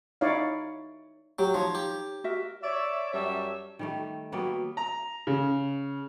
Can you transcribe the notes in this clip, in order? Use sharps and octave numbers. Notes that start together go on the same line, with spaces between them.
D#4 E4 C#5 D5 F5
F#3 G4 A#5
F3 D#4 C#5
G4
F#4 A#4 E5
C#5 D5 E5
F#2 G3 C#5 E5 A5
D#3 G3 A3
F#3 G3 A#3 B3
A#5
C#3